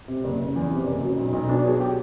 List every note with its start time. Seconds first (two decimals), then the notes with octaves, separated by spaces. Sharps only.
0.08 C3
0.24 F#1
0.39 F#1
0.56 E2
0.71 C3
0.87 F#1
1.03 F#3
1.18 B1
1.33 B1
1.49 B2 D4
1.64 F#3 G#4
1.80 G4